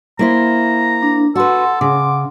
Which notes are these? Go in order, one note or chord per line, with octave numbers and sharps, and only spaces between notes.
A#3 E4 C5 A#5
D4
F#4 A4 B4 F#5 C6
C#3 D6